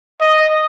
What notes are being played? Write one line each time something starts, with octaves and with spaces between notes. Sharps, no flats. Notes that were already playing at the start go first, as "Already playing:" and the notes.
D#5